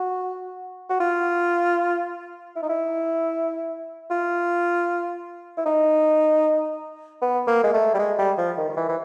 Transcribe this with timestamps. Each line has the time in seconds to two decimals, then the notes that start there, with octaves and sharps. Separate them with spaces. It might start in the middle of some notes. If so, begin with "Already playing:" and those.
Already playing: F#4
0.89 F#4
1.00 F4
2.56 E4
2.62 D#4
2.69 E4
4.10 F4
5.57 E4
5.66 D#4
7.22 B3
7.47 A#3
7.63 G#3
7.73 A3
7.94 G3
7.99 G#3
8.18 G3
8.38 F3
8.57 D#3
8.68 D#3
8.77 E3
8.89 E3